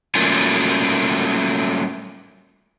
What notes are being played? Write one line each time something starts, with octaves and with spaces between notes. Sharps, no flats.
F#3 G3 A3 A#3 C#4 F4